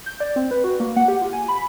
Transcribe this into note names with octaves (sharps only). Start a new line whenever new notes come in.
G6
D5
C4
B4
F#4
A#3
F#5
G4
F4
G#5
B5